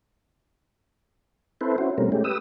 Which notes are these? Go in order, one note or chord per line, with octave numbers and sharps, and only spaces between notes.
C4 E4 A4 B4 C5
C#4 E4 F#4 C5
B2 G3 A3 C4 C#4 A#4
G#3 A3 C#4 G4
G4 B4 D#6 E6